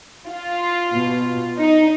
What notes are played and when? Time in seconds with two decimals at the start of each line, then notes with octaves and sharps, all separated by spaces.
0.28 F4
0.93 B2
1.57 D#4